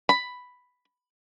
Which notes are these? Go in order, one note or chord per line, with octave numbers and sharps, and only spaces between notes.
B5